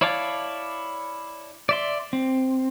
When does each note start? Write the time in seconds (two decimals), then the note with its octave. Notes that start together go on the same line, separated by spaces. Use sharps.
0.01 E4 C#5 D5 F5 A5
1.69 D5 E5 C6
2.13 C4